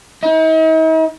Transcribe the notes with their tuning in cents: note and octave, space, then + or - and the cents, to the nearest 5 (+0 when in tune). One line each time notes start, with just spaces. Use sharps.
D#4 +45